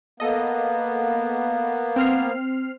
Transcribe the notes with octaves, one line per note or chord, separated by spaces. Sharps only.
A#3 B3 A4 D#5
C4 F6 C7